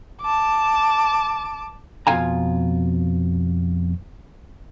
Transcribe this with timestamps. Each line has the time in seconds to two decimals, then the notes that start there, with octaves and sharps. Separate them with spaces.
0.22 A5 D6
2.07 F2 B2 F4 F5 G#5 A#5